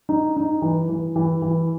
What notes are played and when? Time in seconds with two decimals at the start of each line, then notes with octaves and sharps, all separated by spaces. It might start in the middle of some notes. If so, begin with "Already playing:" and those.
0.09 D#4
0.36 D#4
0.62 E3
0.89 E3
1.16 E3
1.42 E3